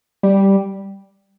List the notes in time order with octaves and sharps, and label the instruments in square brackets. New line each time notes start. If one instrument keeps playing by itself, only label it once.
[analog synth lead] G3